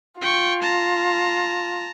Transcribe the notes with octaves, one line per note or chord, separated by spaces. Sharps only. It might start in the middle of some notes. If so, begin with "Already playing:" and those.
F4 G5 C#6
A5 A#5